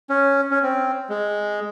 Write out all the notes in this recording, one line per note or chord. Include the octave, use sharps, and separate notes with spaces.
C#4
C#4
C4
G#3